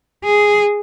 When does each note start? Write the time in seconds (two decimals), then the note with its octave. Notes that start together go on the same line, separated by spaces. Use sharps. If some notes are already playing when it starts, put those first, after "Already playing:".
0.24 G#4